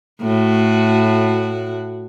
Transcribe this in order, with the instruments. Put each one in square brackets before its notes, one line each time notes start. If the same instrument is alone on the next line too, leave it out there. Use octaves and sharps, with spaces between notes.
[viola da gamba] A2 F#4